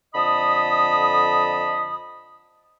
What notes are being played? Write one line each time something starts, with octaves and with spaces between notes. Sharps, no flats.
F2 D3 D#5 A5 B5 D#6